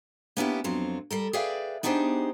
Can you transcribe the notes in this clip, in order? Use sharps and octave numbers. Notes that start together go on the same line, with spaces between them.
A#3 B3 C#4 D4 E4 G4
F2 F#3 C4 F4
G3 A4 A#4
G#4 B4 D5 E5 F5 G5
B3 D4 D#4 G4 G#4 C5